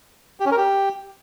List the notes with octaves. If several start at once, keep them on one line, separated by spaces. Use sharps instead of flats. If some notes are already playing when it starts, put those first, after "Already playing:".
G4
C#4
A#4
G4